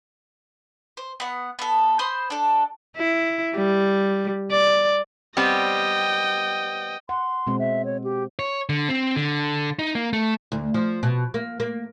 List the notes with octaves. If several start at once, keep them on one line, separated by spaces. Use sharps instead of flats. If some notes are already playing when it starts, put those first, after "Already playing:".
C5
B3 F#5
B3 A4
C5 B5 C6 D#6
D4 A4
E4
G3
D5
G3 B3 C4 D#5 G5
F#5 C6
B2 G#3 C4
E5
C#5
G4
C#5
D3
C4
D3
D#4
A#3
A3
D2
F3
B2
A#3
A#3